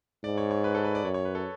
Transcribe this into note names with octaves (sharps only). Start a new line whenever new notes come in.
G#2 D5
C#5
C#5
B4
A4
B4
D5
F#2 C#5
C#5
B4
A4